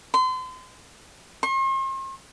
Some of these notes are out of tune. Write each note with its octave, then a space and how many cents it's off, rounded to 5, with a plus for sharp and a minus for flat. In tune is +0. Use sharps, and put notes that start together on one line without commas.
C6 -35
C6 +45